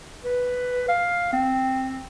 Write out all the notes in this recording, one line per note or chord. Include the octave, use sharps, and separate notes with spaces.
B4
F5
C4